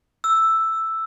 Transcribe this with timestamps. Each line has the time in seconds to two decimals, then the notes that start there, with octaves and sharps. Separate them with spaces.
0.24 E6